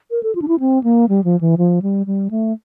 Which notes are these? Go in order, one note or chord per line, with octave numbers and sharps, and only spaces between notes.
A#4
A4
F4
D4
E4
C4
A#3
G3
F3
E3
F3
G3
G3
A3